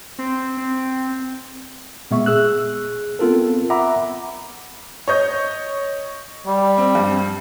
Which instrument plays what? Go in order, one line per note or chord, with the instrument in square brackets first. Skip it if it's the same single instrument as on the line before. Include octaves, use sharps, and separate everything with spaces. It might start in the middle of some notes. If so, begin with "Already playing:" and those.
[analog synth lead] C4
C4
[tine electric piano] A#2 G#3 B3 E5 C#6
G#4 E6 F#6
B3 C4 F4 A4 A#4
E5 F#5 A#5 B5 D6
[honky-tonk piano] C#5 D#5 G6
[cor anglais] G3
[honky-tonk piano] C4
G2